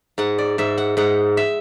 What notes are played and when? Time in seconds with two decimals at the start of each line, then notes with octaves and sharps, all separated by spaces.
0.18 G#2 F#5
0.38 D5
0.58 G#2 E5
0.78 F#5
0.97 G#2 F#5
1.37 E5